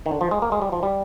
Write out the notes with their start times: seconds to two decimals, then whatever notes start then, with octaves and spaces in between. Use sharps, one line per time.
0.06 D#3
0.11 D3
0.21 F3
0.31 G#3
0.42 A#3
0.52 G#3
0.62 G3
0.72 F3
0.83 G3